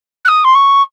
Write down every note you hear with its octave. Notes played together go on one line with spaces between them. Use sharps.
F#6
D#6
C6
C#6